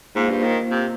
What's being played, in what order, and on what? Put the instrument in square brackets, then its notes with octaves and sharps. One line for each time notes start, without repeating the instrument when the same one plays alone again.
[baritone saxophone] G#2 [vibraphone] A#3 F4 C5 F5
[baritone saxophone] G2
D#3
C3